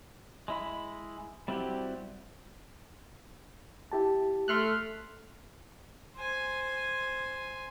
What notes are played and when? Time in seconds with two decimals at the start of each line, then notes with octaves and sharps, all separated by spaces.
0.48 G#3 E4 B5
1.48 G3 C4 E4 F#4 G4
3.92 E4 G4 A5
4.48 A3 C6 F6 F#6
6.16 C5 G#5